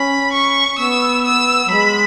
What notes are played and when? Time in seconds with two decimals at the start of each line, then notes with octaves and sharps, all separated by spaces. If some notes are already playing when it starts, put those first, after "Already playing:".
Already playing: C#4 B5
0.33 C#6
0.78 B3 E6
1.25 E6
1.66 F#3
1.71 G#3 B5